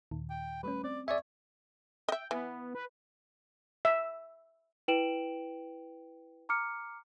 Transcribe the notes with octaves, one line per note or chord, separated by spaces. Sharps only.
D#2 A#2 D#3
G5
G3 A3 C#4 B4
C4 D5
G#4 D5 E5 C#6 G#6
D#5 E5 G5
E3 B3
B4
E5
E4 B4 G5 D7 E7 F#7
A#5 D6 F6 C#7